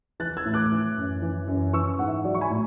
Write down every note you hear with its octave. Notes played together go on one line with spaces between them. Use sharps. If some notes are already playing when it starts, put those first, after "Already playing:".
E3 F#6 A6
E6 G#6
A2
D6 F#6
E3
F#2
E3
F#2
E3 C#6 E6
G#2 F#5
E5
F#3 D5
C#6
G#5 B5
A2